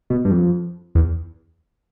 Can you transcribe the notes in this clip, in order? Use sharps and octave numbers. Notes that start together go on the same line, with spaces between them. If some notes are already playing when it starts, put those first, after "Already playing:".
B2
G2
F2
E2